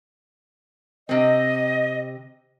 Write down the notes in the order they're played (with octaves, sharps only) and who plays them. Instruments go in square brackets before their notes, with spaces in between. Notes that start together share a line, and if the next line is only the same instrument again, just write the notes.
[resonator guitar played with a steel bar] C3 C4 [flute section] D#5